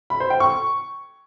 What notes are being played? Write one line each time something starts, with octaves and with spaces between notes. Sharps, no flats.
B5
C5
G5
C#6